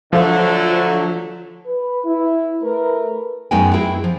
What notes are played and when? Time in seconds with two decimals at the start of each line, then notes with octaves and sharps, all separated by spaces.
0.13 D3 F3 F#3 A3
1.67 B4
2.05 E4
2.63 A3 A#4 B4
3.51 F#2 G#3 B3 D#4 G5 G#5
3.74 C4 E4 G#4 G5
4.04 F3